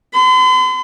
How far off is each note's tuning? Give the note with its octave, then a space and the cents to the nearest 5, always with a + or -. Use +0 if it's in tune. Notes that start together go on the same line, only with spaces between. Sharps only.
C6 -45